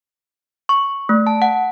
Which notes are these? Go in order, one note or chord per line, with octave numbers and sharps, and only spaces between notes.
C#6
A3
A5
F#5